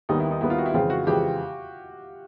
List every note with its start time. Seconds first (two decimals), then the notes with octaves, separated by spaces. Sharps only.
0.09 D#2 D#3 G3 B3 D#4
0.20 E4
0.31 D#4
0.41 D#2 D#3 G3 B3 E4
0.50 F4
0.58 F#4
0.66 E4
0.74 F2 C#3 E3 G#3 C4 F4
0.90 F#4
1.07 F2 C#3 E3 G#3 C4 G4